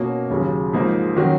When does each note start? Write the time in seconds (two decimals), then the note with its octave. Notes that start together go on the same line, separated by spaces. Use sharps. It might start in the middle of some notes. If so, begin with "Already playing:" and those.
Already playing: B2 A#3 C#4 F#4
0.30 D#2 C#3 F#3
0.73 G#2 F3 A#3 D#4
1.16 D#3 F#3 C#4 F#4